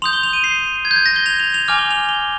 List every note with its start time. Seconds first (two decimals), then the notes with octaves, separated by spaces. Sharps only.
0.02 C6 D#6 G6 F7
0.13 G7
0.23 F7
0.33 D#7
0.44 C7
0.85 G#6
0.91 G6
0.96 G#6
1.06 A#6
1.16 G7
1.26 F7
1.40 F7
1.54 F7
1.68 G#5 D6 F6 F7
1.79 G7
1.91 F7
2.09 G7